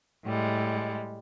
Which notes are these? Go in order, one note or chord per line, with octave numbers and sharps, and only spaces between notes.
A2 G3 G#3